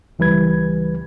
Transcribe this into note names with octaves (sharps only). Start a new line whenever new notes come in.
C#2 E3 G3 B4 G#6